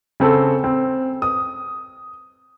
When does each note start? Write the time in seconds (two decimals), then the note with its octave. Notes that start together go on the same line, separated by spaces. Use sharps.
0.20 C#3 C4 A4
0.64 C4
1.22 D#6